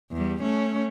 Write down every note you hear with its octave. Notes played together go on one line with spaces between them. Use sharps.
E2 G3
A3 C#4